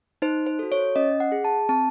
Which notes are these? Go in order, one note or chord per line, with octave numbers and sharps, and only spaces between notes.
D#4 C5
C5
F#4 A4
C#5
C#4 D#5
F#5
G#4
A5
C4 A5